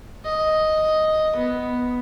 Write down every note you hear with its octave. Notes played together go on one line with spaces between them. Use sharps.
D#5
B3